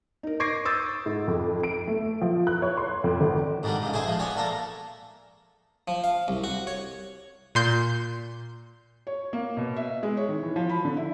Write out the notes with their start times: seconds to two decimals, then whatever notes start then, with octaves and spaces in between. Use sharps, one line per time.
0.23 D#4 A#4
0.40 C#6 D6 G#6 A#6 C7 D7
0.65 C#6 D#6 E6 G6 A6 C7
1.06 G#2
1.28 F2
1.63 D7
1.87 A3
2.22 F3
2.47 F#6
2.62 C#5
2.77 C6
3.04 F2
3.21 G#1
3.63 G#2 D3 D#3 G3
3.82 G#2 C#3
3.93 A3 G#4 C5 G#5
4.06 F3 G#3
4.19 B3 C#5 D5 G#5
4.36 A3 A#3 A4 A#4
5.88 F3
6.04 F5
6.28 C2
6.44 F#4
6.67 C#5
7.55 A#2 C6 G6
9.07 C#5
9.33 A#3
9.57 B2
9.76 E5
10.03 G#3
10.17 C#5
10.29 D#3
10.43 E3
10.56 F3
10.69 B5
10.85 D3
10.97 E4